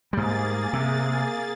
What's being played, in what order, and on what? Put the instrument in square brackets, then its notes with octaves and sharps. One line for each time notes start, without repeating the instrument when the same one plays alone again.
[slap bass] G#2 G3 [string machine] A#3 G#4 A6
[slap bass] C3